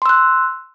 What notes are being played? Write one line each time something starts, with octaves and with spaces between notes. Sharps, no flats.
C6 E6 F#6